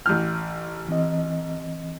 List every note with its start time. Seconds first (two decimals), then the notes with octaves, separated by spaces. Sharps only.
0.06 A1 F6 G6
0.88 E3 C4 D#5